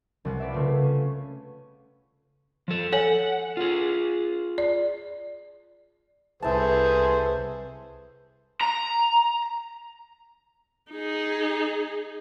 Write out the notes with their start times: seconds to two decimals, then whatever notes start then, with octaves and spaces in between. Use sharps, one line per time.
0.25 C2 G3 F#5
0.40 B4 D5 E5
0.52 C#3 A3 F4
0.84 C#4
2.68 F3 A4
2.92 A4 C#5 F#5 G#5
3.57 F4 G#4
4.58 D5
6.42 C2 E4 G#4 A4 B4 C5 A5
8.61 A#5
10.91 D#4 G#4